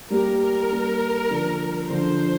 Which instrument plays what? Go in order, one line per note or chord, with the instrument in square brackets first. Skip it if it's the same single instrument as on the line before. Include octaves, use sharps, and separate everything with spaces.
[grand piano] G3 A#3 G4 [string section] A#4
[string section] A#4
[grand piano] G3 A#3 G4
D3 F3 D4
[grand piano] D3 F3 D4 [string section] C5